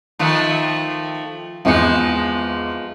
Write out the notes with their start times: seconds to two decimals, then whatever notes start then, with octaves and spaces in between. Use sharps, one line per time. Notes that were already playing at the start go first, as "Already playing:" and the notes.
0.19 D#3 F3 A3
1.65 G#1 E2 F3 G#3 C#7